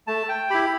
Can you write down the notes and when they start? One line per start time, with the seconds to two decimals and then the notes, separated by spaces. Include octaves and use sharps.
0.07 A3 A5
0.29 G5
0.50 E4 G4 B5